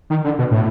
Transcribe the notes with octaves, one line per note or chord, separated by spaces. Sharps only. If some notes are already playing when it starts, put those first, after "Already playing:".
D#3
D3
B2
A2